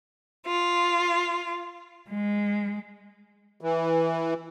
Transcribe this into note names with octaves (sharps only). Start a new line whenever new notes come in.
F4
G#3
E3